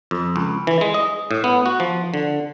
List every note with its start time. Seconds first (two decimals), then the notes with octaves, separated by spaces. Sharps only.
0.11 F2
0.36 C#2
0.67 E3
0.81 G#3
0.94 D#5
1.31 A2
1.44 B3
1.66 F#4
1.80 F3
2.14 D3